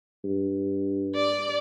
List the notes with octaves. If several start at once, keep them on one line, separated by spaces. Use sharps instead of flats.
G2
D5